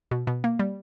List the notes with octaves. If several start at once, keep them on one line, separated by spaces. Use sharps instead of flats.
B2
B2
A#3
G3